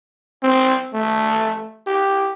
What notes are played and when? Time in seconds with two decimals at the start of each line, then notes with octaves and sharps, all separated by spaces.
0.43 C4
0.94 A3
1.87 G4